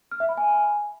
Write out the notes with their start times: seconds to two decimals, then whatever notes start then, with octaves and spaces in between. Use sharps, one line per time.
0.11 F6
0.20 E5
0.29 B5
0.37 G#5